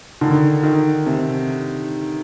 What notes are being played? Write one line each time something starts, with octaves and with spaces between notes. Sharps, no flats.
D3 D#3
D#3
C3